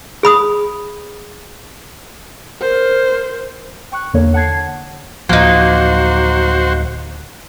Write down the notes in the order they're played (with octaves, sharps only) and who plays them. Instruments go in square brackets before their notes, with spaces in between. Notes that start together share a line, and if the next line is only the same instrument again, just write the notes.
[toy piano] G#4 B5 D#6
[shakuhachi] A#4 [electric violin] C5
[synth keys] G5 C#6 F#6
E2 D3 A#3 C#5
F#5 A5 G#6 C7
[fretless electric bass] D1 F3 [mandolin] A#3 D#4 [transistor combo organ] F#4 C5